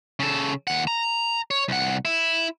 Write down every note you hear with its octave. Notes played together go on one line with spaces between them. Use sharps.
C#3 A4
D#2 F#5
A#5
C#5
C2 F#5
E4